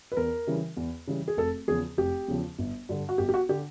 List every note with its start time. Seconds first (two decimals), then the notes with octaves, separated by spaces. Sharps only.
0.12 B4
0.17 E2 A#4
0.47 C#3 E3 G3
0.77 E2
1.07 C#3 E3 G3
1.28 G#4
1.37 F1 A4
1.68 E2 C#3 F3 G#4
1.98 F1 G4
2.28 E2 C#3 F3
2.58 G1
2.89 G2 D3
3.09 F#4
3.18 G1 G4
3.29 G4
3.34 F#4
3.49 D3 G4